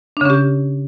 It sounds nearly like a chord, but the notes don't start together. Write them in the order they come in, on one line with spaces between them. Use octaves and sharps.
D4 C#3 C#4 G4